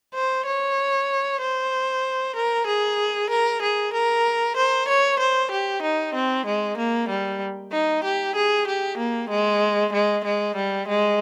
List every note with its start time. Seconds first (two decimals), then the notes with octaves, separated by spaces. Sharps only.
0.15 C5
0.47 C#5
1.41 C5
2.36 A#4
2.67 G#4
3.30 A#4
3.62 G#4
3.94 A#4
4.57 C5
4.88 C#5
5.20 C5
5.52 G4
5.82 D#4
6.14 C4
6.46 G#3
6.78 A#3
7.09 G3
7.72 D#4
8.04 G4
8.36 G#4
8.68 G4
8.98 A#3
9.30 G#3
9.93 G#3
10.25 G#3
10.56 G3
10.88 G#3